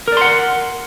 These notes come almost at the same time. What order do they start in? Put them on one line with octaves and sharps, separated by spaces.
A#4 D5 C6 F#5